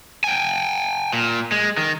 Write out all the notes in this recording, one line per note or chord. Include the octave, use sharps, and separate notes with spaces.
G5 G#5
A#2
G#3
D#3